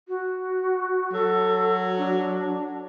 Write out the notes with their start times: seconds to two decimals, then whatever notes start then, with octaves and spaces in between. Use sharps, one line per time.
0.08 F#4
1.12 F#3 A4
1.97 D4